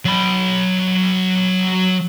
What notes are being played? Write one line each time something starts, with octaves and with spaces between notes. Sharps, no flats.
F#3 B5